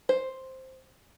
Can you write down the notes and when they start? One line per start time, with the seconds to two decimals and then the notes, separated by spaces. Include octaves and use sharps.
0.09 C5